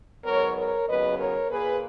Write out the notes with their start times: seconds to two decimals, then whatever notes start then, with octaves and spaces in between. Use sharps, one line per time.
0.24 G#2 F#3 B3 A#4 C#5
0.56 A#4 C#5
0.87 D#2 C#3 F#3 B3 B4 D#5
1.18 A#4 C#5
1.49 A#2 A#3 G#4 B4